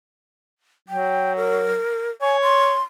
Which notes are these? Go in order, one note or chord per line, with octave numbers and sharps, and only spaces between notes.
F#3 G5
A#4
C#5 G#5
C6